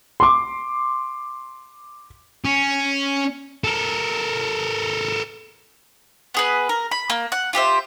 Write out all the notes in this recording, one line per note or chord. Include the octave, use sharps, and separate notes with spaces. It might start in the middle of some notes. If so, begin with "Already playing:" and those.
C6 D6
C#4
A4 A#4
B3 G#4 B4
A#4
B5
A#3
F#5
F4 G4 C5 E5